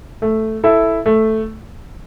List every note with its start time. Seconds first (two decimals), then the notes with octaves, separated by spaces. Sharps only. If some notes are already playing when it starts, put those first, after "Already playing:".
0.22 A3
0.64 E4 A4 E5
1.06 A3